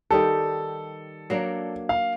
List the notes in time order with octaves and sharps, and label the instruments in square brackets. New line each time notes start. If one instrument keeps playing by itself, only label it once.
[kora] D#3 G3 G4 [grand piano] A4
[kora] F#3 A#3 D4
[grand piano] F5